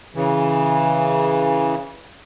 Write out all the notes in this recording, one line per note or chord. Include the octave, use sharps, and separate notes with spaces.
C#3 E3